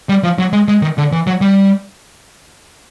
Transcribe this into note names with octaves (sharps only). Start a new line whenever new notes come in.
G3
F3
F#3
G#3
G#3
D#3
D3
E3
F#3
G3